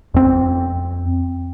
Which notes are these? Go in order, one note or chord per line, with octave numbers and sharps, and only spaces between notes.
F2 C4